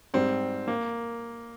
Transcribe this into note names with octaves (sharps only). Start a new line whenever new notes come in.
G#2 G3 C4
A#3